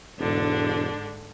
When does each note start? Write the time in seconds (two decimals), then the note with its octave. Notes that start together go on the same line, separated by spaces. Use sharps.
0.19 E1 G#2 D3 D4